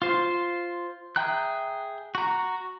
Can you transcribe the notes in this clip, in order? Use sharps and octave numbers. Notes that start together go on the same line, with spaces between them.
F4 C5
G#4 E5 G5 A#5 F#6
F#4 A#5